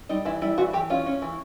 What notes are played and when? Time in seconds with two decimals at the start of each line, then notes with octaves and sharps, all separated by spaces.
0.09 G3 D#4
0.25 E3 E4
0.41 G3 E4
0.58 E3 F#4
0.73 E3 G4
0.90 C#4 F4
1.06 C#4
1.22 E3